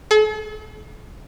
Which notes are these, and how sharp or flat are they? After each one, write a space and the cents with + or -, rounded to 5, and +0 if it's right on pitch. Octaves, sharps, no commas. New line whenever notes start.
A4 -45